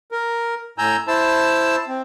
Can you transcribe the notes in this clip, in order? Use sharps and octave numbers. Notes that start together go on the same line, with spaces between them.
A#4
A2 G#5 A#5 E6 G6
E4 C5 A5 E6
C4